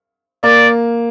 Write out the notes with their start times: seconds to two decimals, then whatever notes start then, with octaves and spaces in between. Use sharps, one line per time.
0.43 A#3 D5